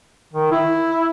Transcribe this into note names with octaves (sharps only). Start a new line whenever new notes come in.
D#3
E4